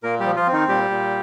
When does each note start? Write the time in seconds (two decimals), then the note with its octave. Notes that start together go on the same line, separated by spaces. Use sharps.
0.03 A#2 A#3 A#4
0.20 G3 G4
0.25 F3
0.36 F3 F4
0.47 C4
0.53 D#3 D#4
0.68 A#2 G3 G4
0.90 A#2